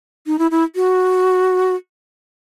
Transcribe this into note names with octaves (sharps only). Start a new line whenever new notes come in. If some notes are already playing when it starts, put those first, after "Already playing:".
D#4
E4
E4
F#4